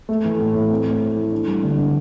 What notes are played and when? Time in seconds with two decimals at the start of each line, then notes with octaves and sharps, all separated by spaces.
0.09 A3
0.25 E3
0.39 A2
0.55 A2
0.70 C4
0.86 A3
1.01 E4
1.16 E3
1.32 D4
1.47 G3
1.63 D3
1.78 D3